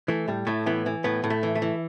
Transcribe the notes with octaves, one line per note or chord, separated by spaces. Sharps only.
E3 A3
A2 G3
A2 A3
E3 B3
E3
A2 B3
A2
A3
E3
A3
E3